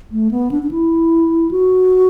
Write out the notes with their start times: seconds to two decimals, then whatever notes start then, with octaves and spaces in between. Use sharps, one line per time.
0.12 A3
0.31 B3
0.51 D4
0.63 D4
0.71 E4
1.51 F#4